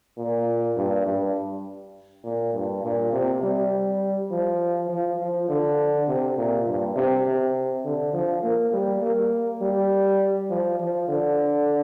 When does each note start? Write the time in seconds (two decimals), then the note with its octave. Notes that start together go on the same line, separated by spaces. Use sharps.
0.18 A#2
0.77 G2
1.06 G2
2.24 A#2
2.54 G2
2.84 A#2
3.13 C3
3.43 G3
4.31 F3
4.89 F3
5.20 F3
5.49 D3
6.08 C3
6.38 A#2
6.66 G2
6.96 C3
7.26 C3
7.84 D3
8.14 F3
8.44 A#3
8.74 G3
9.02 A#3
9.62 G3
10.50 F3
10.79 F3
11.08 D3